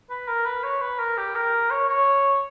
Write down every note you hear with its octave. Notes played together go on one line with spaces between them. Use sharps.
B4
A#4
B4
C#5
B4
A#4
G4
A#4
C#5
C#5